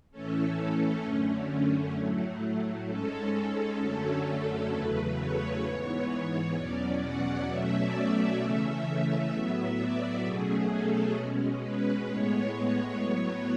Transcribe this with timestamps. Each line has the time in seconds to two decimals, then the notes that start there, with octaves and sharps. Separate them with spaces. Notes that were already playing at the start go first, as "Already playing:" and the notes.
0.11 A2 E3 A3 C#4 A4
0.57 A4
1.03 F#2 D3 A3 C#4
1.95 A2 F#3 A3
2.87 G#2 G#3 C#4 A4
3.79 F#2 D3 F#3 A3 C#4
4.71 E2 C#3 F#3 A3 B4
5.17 C#5
5.63 G#2 E3 B3
6.55 E2 B2 F#3 C#4 D5
7.01 F#5
7.47 B2 F#3 A3 C#4 E5
7.77 D5
8.39 C#3 E3 A3 C#4 E5
9.31 A2 F#3 B3 E5
9.77 D5
10.23 B2 F#3 A3 C#4 G#4
10.69 A4
11.15 B2 G#3 C#4
11.61 B4
12.07 A2 G#3 B3 C#5
12.99 A2 F#3 B3